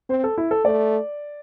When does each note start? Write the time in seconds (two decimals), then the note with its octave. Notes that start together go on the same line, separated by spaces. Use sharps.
0.09 C4 C5
0.24 A4
0.38 E4
0.51 A4
0.65 A3 D5